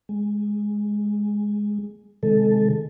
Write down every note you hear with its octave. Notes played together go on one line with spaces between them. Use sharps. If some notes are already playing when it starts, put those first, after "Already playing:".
G#3
C3 D#3 G#3 A4